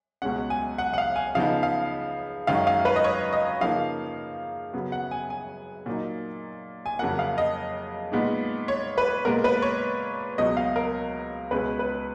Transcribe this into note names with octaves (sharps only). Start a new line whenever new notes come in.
C#2 B2 G#3 C#4 F#5
G#5
F#5
F#5
F5
G#5
C#3 F3 B3 D#4 F5
F5
F#2 D#3 G#3 C#4 F5
F5
B4
D#5
C#5
D#5
C#3 F3 A#3 D#4 F5
C#3 F#3 B3
F#5
G#5
G#5
A#2 F#3 A#3 D#4
G#5
F2 C#3 F#3 A#3 F#5
F5
D#5
A#2 G#3 B3 D#4
C#5
B4
A#2 G#3 B3 A#4
B4
C#5
C#2 B2 F#3 D#5
F5
A#4
C#2 B2 G#3 C#4 B4
B4